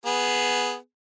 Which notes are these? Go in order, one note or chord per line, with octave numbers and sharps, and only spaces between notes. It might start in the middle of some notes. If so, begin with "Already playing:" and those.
B3 G#4